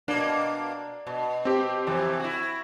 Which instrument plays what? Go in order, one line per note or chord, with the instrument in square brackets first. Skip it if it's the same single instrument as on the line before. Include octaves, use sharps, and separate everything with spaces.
[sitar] B2 A#3 [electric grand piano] D4
[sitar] B2
[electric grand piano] C4 G4
[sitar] F2 C3 E3
E4 F#4